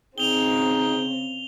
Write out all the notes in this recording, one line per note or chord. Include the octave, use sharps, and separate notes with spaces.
C#3 C4 D#4 G#4 G5 F7 G7